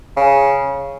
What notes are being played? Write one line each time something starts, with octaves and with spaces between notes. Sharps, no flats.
C#3